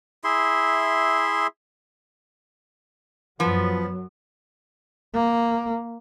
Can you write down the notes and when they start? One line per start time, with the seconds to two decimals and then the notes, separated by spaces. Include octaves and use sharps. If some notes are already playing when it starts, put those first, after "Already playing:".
0.24 E4 G#4 E5 C6
3.40 F#2 F3 F#3 B3
5.14 A#3